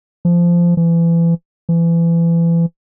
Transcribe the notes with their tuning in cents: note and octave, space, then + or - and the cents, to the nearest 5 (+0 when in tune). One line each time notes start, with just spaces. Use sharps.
F3 -15
E3 +30
E3 +30